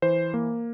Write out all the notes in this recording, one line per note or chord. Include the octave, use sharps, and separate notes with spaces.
E3 C5
A#3